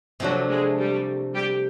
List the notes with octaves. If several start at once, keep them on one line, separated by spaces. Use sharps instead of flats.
C3 F3 F#3 A3 D4 F#4
G#3 G#4
G3 G4
G3 G4